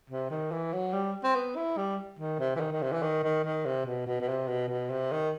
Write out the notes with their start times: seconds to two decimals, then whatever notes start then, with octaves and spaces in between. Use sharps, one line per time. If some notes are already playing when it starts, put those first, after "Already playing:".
0.10 C3
0.31 D#3
0.51 E3
0.73 F#3
0.93 G3
1.23 C4
1.36 B3
1.56 E4
1.77 G3
2.19 D#3
2.40 C3
2.56 E3
2.60 D#3
2.72 D#3
2.82 C3
2.92 E3
3.02 D#3
3.23 D#3
3.44 D#3
3.65 C3
3.86 B2
4.07 B2
4.21 B2
4.28 C3
4.48 B2
4.69 B2
4.90 C3
5.12 D#3